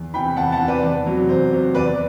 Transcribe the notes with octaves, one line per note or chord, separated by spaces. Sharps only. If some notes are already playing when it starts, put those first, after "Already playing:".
Already playing: E2
C3 E3 G5 B5
E2 F#5 A5
F#5 A5
C3 E3
B4 D5
E2
C3 F#3
E2 C5
C3 F#3
E2 B4 D5